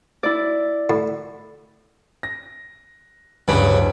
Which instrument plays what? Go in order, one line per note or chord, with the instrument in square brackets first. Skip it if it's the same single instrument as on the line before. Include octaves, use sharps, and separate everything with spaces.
[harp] E4 D5
[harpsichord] A2
[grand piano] A#6
[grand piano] D1 B4 D7 [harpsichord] G2 C#3